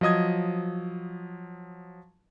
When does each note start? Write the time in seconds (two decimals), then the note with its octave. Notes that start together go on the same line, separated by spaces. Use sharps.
0.01 F3 F#3 D#5 D#6 G#6